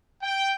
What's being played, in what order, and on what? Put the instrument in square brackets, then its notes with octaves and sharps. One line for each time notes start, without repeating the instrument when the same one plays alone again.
[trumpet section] G5